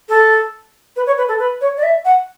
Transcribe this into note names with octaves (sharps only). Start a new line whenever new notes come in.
A4
B4
C#5
B4
A4
B4
C#5
D5
E5
F#5